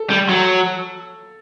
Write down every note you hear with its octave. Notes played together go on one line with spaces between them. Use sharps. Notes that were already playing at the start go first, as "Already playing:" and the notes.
Already playing: A4
G3
F#3